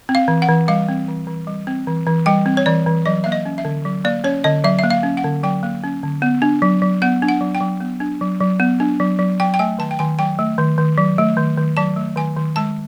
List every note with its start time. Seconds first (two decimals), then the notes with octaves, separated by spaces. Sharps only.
0.09 C4
0.15 F5
0.28 E3
0.42 F#5
0.49 E3
0.68 G3 F5
0.89 C4
1.08 E3
1.27 E3
1.47 G3
1.67 C4
1.87 E3
2.07 E3
2.26 G3 G5
2.46 C4
2.57 C#5
2.66 E3 D5
2.86 E3
3.06 F#3 D#5
3.24 A#3 E5
3.32 D#5
3.45 C#4
3.58 E5
3.65 D3
3.85 F#3
4.04 A#3 D5
4.24 C#4 C#5
4.44 D3 D#5
4.64 F#3 E5
4.79 A#3 E5
4.90 F5
5.03 C#4
5.17 F#5
5.24 D3
5.43 F#3 G5
5.63 A#3
5.84 C#4
6.03 D3
6.22 B3
6.42 D4
6.62 F#3
6.82 F#3
7.02 B3 F#5
7.22 D4
7.29 F#5
7.41 F#3
7.55 G5
7.61 F#3
7.80 B3
8.00 D4
8.21 F#3
8.40 F#3
8.60 B3
8.80 D4
9.00 F#3
9.19 F#3
9.40 F#3 G5
9.54 G5
9.59 A3 G#5
9.78 D#3 A5
9.91 G5
9.99 D#3 G#5
10.19 F#3 G5
10.39 A3
10.58 D#3
10.78 D#3
10.98 F#3
11.18 A3
11.37 D#3
11.57 D#3
11.77 F#3 A5
11.96 A3
12.16 D#3 G#5
12.36 D#3
12.56 G#3 A5